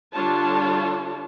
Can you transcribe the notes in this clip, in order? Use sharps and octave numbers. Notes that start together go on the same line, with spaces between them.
D3 G3 D4 F4 C#5 A5